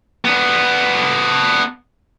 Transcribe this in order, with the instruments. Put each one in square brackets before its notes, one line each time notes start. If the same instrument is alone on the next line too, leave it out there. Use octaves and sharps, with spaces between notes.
[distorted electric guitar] B3 D4